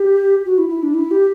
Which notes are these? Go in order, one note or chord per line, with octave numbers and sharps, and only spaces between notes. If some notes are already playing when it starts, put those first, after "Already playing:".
Already playing: G4
F#4
E4
E4
D4
E4
G4